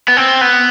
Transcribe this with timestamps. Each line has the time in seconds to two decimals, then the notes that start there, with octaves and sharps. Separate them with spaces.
0.08 B3
0.17 C4
0.41 B3